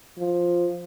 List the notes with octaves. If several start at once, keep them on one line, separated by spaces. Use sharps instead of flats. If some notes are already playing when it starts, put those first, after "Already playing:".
F3